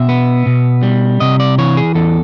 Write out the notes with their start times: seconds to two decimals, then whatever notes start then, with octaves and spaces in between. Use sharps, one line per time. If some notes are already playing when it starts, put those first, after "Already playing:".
Already playing: B2 E5
0.09 B3
0.46 B2
0.83 G3
1.20 C3 D#5
1.40 D5
1.58 E3 C#5
1.77 G#4
1.95 E2 A4